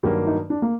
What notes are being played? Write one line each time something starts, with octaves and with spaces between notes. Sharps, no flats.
G2 D#3 F#3 A#3 G4
D#4
D4
A#3